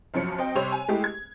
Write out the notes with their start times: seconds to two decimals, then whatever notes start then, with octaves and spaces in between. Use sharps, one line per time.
0.14 B1 F#2 F3 C#4 C#7
0.38 C4 D#5 G5
0.55 C3 G3 C5 C#5 C6 F7
0.72 G#5
0.89 G#3 A3 E4 G4
1.04 G#6